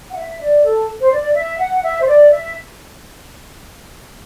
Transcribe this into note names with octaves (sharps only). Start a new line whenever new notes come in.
F#5
E5
D5
A4
C5
D5
E5
F#5
E5
C5
D5
E5